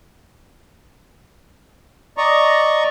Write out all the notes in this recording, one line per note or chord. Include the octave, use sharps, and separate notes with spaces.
D5 D#5 A#5 C#6